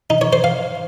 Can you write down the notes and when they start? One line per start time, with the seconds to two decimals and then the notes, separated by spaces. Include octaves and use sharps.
0.10 D#4
0.21 C#5
0.33 C5
0.44 F5